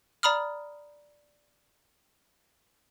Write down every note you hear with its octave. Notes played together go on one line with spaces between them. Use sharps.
D5 A#5 B5 D#6 F6